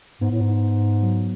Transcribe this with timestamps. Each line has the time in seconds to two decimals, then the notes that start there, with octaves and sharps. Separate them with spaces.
0.21 G#2 B3
0.31 A2
0.41 G#2
1.03 F#3